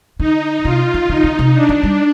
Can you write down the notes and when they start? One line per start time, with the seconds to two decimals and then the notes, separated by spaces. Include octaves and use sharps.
0.19 D3 D#4
0.64 C3 F4
0.94 D#3
1.09 D3 D#4
1.24 D3
1.39 C3
1.54 D4
1.69 F3
1.83 G3